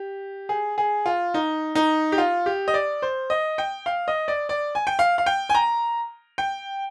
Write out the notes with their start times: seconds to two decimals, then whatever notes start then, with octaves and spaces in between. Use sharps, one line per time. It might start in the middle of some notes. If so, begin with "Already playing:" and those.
Already playing: G4
0.49 G#4
0.78 G#4
1.06 F4
1.34 D#4
1.75 D#4
2.12 G4
2.18 F4
2.46 G4
2.68 D#5
2.74 D5
3.02 C5
3.30 D#5
3.58 G5
3.86 F5
4.08 D#5
4.28 D5
4.49 D5
4.75 G#5
4.87 G5
4.99 F5
5.18 F5
5.26 G5
5.49 G#5
5.55 A#5
6.38 G5